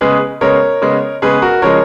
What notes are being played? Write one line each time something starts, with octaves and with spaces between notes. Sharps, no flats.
C#3 G#3 B3 G#4 B4
C#3 G#3 B3 A#4 C#5
C#3 G#3 B3
C#3 G#3 B3 G#4 B4
F#4 A#4
C#3 F3 G#3 A#4 C#5